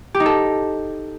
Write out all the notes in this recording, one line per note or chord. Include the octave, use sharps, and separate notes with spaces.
G4
D#4
A4